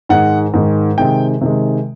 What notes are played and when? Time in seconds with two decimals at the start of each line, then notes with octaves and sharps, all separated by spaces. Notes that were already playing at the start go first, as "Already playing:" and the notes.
0.09 G#2 D#3 G#3 F#5
0.54 G#2 D#3 G#3
0.98 C3 D#3 G#3 G5
1.41 C3 D#3 G#3